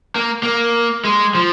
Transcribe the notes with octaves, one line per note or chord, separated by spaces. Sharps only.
A#3
A#3
G#3
F3